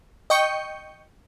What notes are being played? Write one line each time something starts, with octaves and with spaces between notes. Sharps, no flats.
D#5 G5 C#6 G6 C#7